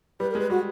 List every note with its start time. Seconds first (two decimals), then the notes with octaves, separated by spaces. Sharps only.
0.20 G3 B4
0.31 A#4
0.35 G#3 B4
0.50 G3 F#4